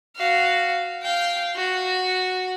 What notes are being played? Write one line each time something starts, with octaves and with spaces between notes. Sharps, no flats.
F#4 F5
F5 G5
F#4